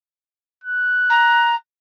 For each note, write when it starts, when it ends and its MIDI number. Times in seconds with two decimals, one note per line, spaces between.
0.64 1.56 90
1.10 1.55 82